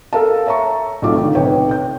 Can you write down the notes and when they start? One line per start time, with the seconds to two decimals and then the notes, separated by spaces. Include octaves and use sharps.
0.13 A4 A#4 F5 A5
0.46 C#5 E5 A5 A#5 C#6
1.02 B1 A3 C4 F4 D6
1.17 D3 D#3
1.35 B1 C3 B4 C#5 G5
1.71 G6